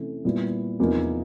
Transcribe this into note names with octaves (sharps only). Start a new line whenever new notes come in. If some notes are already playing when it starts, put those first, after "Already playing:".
Already playing: C3 E3 A3 C#4
A#2 G3 B3 E4
E2 C3 F3 A#3 D#4